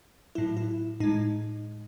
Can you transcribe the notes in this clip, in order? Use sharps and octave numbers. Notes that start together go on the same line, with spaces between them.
A2 F#3 E4
E4
A2 G#3 D#4